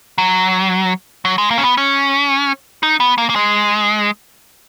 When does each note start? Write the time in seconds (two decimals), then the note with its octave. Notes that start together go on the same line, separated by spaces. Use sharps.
0.18 F#3
1.25 F#3
1.38 G#3
1.51 A#3
1.58 C#4
1.63 B3
1.78 C#4
2.83 D#4
3.00 B3
3.18 A#3
3.30 A#3
3.36 G#3